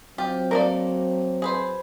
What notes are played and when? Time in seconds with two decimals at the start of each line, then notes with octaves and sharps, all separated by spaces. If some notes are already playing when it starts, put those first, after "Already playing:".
0.18 F#3 C4 F4 G4
0.51 A3 A#3 A#4 D5
1.42 G#4 B4 C5